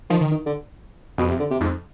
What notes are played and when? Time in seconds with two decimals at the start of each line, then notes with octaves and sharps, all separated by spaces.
0.10 D#3 F3
0.21 D#3
0.31 D#3
0.46 D3
1.18 F2 B2
1.29 C3
1.40 D3
1.51 C3
1.61 F2 G#2